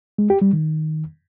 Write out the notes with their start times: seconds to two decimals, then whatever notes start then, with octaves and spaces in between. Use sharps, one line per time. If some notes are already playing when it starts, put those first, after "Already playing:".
0.18 G#3
0.30 G4
0.42 G3
0.53 D#3